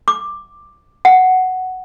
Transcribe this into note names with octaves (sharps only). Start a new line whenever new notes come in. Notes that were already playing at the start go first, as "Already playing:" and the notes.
D6
F#5